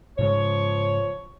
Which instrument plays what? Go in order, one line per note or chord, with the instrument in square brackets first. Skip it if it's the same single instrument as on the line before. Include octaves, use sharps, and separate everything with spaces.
[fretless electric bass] G#2 C#3 G#3 [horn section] F3 C#5